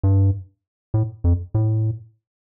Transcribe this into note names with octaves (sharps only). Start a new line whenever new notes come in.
G2
A2
F2
A2